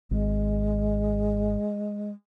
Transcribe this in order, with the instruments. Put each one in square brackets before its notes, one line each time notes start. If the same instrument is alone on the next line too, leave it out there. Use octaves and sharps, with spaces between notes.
[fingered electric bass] G#1 [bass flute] G#3